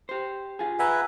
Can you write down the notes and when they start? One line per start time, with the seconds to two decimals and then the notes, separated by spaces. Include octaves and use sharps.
0.09 G4 C5
0.59 F4 G#4
0.79 B4 E5 F#5 G#5 A#5